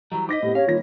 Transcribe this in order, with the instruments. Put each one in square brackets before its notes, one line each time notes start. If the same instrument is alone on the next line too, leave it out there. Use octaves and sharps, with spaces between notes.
[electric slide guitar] E3 F#3 G3 [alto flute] A#5
[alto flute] D#4 [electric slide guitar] C5 D#5 [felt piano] D6 A#6 B6
[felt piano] A2 B3 [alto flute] G4
[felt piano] C#4 [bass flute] C#5 [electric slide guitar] F5
[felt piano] D#3 A#3 A#6 [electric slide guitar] G3 [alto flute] F4